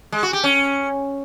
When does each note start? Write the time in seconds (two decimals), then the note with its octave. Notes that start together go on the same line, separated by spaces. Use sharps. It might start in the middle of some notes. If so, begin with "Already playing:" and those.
0.12 G#3
0.23 F#4
0.33 G4
0.44 C#4